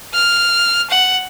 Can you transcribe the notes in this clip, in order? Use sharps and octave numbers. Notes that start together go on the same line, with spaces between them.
F6
F#5